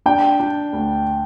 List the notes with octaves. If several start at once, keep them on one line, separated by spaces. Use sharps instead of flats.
D4 G5
D4
D2